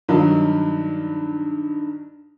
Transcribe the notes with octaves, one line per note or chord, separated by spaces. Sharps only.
G2 D#3 F#3 D#4